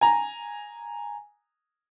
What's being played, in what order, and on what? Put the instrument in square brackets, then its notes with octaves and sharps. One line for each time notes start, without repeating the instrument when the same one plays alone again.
[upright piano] G#5 A#5